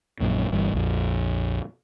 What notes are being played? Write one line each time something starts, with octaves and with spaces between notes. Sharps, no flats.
A#1 F#2 A#2
G1 G2 E3
A#1 F2